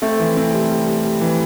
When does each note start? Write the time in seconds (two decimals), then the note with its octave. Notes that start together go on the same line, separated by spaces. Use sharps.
0.02 A3 C4
0.20 E3
0.37 C4
0.53 G3
0.70 G3
0.87 G3
1.04 G3
1.21 E3